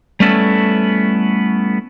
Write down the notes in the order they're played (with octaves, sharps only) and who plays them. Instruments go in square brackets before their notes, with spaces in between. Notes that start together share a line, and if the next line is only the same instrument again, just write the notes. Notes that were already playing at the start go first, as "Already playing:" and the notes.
[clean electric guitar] G3 A3 B3 C#4 E4 A4